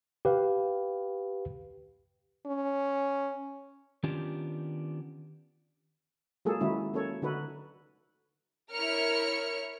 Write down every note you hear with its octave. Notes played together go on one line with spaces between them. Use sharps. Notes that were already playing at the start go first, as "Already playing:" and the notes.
G4 B4 F5
C#4
D#3 B3 C#4 D4 F4 G4
F#3 G#3 A#3 F4 G#4 A4
D#3 F#3 G#3 C#4 E4 F#4
F#3 A#3 C#4 A4 C#5
D3 D#4 F#4 A4 B4
E4 A#4 C#5 F6 C#7